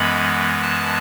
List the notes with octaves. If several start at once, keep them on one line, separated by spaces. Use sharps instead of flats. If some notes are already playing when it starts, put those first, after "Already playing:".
Already playing: F#2 E3 G#3 B3 B5
A5